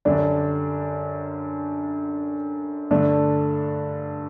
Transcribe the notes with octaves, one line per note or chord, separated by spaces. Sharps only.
F#2 D3 G3 D4
G2 D3 A3 D4